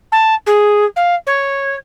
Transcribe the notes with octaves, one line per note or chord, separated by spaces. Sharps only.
A5
G#4
F5
C#5